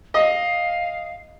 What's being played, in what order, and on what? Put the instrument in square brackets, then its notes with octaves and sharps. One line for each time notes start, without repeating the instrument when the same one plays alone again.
[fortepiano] D#5 [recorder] F5